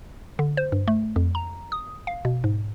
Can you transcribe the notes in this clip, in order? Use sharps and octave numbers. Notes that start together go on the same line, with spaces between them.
D3
C5
G2
A3
F2
A#5
D#6
F5
B2
G#2